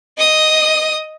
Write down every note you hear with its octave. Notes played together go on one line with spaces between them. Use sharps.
D#5 D#6